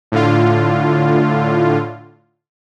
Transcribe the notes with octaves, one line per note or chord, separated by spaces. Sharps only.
A2 D3 F4